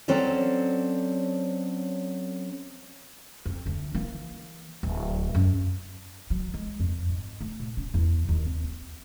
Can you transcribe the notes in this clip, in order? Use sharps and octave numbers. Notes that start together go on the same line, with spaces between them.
F#3 C4 C#4 A4 D5
F2
D2 D3
E3 A#3
D1
F#2
F#3
G#3
F2
G#2
A3
A#2
C#4
E2
D#2
C4
C4